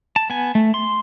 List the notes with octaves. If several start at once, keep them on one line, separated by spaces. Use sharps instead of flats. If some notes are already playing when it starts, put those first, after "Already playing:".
A5
B3 G#5
A3
C6